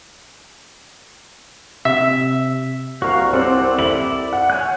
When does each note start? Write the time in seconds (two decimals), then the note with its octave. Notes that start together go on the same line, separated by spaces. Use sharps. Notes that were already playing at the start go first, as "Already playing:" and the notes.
1.85 C3 E5
3.02 C2 F#4 A#4 F5
3.33 C4 A4 D5 F#5
3.79 E4 D5 F#7
4.33 F#5
4.50 C#5 G#5 F#6